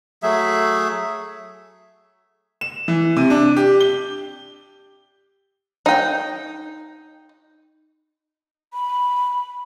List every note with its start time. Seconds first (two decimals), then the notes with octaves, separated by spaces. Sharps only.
0.23 F#3 A3 G#4 E5
2.61 E7
2.88 E3
3.16 C3
3.30 D4
3.56 G4
3.81 G7
5.86 D#4 G5
8.74 B5